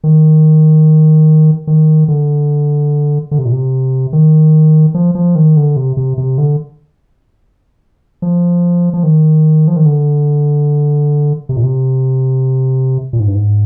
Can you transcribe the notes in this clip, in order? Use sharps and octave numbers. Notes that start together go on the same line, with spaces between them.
D#3
D#3
D3
D3
C3
A#2
C3
D#3
F3
F3
D#3
D3
C3
C3
C3
D3
F3
F3
D#3
F3
D#3
D3
C3
A#2
C3
A#2
G#2
G2
G#2